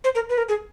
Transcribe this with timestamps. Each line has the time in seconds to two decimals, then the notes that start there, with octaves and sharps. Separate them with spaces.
0.04 C5
0.15 A#4
0.30 B4
0.38 A#4
0.49 G#4